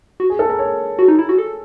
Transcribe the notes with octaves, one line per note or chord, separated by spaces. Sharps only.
F#4
G#4
A4
A#4
C#5
F#4
D#4
E4
F#4
A4